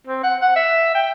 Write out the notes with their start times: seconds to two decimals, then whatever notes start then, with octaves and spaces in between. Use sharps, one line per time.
0.07 C4
0.23 F#5
0.42 F#5
0.56 E5
0.95 G5